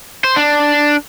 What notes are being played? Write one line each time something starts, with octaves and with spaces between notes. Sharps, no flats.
C5
D4